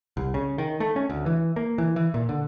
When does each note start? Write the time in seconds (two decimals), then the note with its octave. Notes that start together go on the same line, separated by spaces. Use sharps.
0.17 C2
0.34 C#3
0.58 D#3
0.80 A3
0.96 C#4
1.10 D2
1.26 E3
1.56 A#3
1.78 E3
1.96 E3
2.14 A#2
2.29 D3